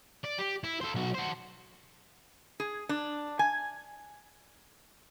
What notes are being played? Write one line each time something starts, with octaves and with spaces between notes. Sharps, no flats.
D5
G4
E4
A4 C5
B1 F#4
F#4 C5
G#4
D4
G#5